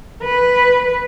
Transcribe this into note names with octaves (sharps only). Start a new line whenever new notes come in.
B4